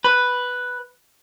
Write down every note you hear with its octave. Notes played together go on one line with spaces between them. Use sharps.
B4